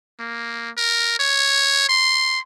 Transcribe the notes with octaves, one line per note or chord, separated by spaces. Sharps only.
A#3
A#4
C#5
C6